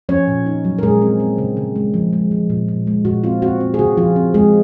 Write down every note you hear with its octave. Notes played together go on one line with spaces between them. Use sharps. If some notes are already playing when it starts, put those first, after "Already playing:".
F3 C#4 C#5
A#2
D#4
F#3
A#4
A#2 G#3 G#4
C4
C4
C#3
C#3
G#3
F3
G#3
F3
A#2
A#2
G#3
A#2 F#4
C4 F4
C4 F#4
C4
G#4
C#3 F#4
F3 F4
C4
G#3 C4 G#4